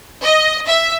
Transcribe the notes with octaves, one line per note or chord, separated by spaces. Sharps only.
D#5
E5